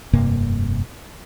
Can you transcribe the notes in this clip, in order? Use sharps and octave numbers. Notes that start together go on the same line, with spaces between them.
F1 G2 C3 A#3